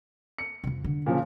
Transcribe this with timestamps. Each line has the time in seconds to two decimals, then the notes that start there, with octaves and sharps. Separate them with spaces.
0.38 C#7
0.64 F2 C3
0.84 D3
1.06 A#2 C#3 F3